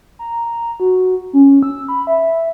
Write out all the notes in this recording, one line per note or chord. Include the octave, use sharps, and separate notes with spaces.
A#5
A#5
F#4
C#4
E6
B5
E5